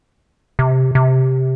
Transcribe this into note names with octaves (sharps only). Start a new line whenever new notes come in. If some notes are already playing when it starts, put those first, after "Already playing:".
C3
C3